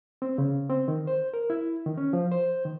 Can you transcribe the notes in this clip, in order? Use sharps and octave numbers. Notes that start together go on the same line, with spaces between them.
C4
C#3
C4
D#3
C5
A#4
E4
D#3
C#4
F3
C5
D#3